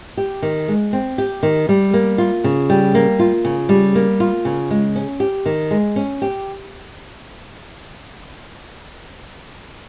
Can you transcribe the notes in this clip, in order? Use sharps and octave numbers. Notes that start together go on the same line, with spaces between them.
G4
D#3
G#3
C4
G4
D#3
G3
A#3
F4
C#3
G3
A#3
F4
C#3
G3
A#3
F4
C#3
G#3
C#4
G4
D#3
G#3
C#4
G4